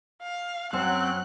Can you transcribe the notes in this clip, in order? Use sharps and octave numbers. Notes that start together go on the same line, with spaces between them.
F5
F#2 F#3 C4 C5 F#5 E6 F#6